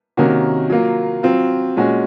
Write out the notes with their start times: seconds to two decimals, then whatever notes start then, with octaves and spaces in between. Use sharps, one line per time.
0.17 C3 D#3 A#3 C#4 F#4
0.70 F#3 A#3 F4
1.23 F#3 C4 F4
1.76 A#2 G#3 C#4 F#4